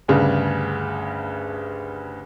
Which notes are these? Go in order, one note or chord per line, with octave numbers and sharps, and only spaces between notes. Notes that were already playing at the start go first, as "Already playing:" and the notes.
D2 G2 C#3